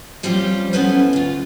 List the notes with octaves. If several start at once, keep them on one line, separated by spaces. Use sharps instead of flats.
F3 G3 C4 C#4 F4 G4
B3 C#4 E4 A4 B4 C5
D2 F4